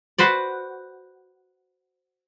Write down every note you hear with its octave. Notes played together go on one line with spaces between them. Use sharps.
F#4 B4 C5 D5